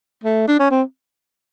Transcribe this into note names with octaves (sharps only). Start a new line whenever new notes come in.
A3
D4
C#4
C4